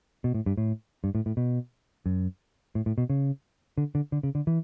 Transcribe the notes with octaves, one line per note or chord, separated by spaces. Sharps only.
B2
A2
G2
A2
G2
A2
A2
B2
F#2
A2
A2
B2
C#3
D3
D3
D3
C#3
D3
E3